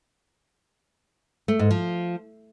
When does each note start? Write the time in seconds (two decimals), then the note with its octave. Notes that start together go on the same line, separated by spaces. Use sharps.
1.48 A3
1.59 G#2
1.71 F3